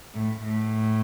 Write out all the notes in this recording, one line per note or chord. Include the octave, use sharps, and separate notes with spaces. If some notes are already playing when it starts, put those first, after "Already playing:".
A2
A2